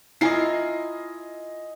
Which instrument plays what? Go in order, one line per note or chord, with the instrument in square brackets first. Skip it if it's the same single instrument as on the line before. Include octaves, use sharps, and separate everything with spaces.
[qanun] E4 F4 A#4 [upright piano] D#5 G#5 C7